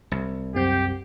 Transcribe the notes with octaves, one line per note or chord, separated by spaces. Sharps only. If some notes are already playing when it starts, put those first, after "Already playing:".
C2
F#2 C4 G4 G6